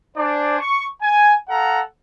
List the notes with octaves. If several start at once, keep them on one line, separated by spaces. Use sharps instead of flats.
D4 C5 D5 G#5
C#6
G#5
A4 F5 F#5 A#5